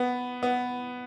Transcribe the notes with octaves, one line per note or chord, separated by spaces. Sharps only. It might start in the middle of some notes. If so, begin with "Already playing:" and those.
Already playing: B3
B3